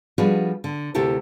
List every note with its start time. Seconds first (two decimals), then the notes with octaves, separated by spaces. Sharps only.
0.18 F3 G3 D4 F#4 G#4 B4
0.64 D3
0.94 D2 C3 E4 G4 A4 A#4